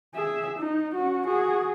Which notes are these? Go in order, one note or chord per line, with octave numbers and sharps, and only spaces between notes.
G#4 E5
D#4
C#4 F#4
F#4 G#4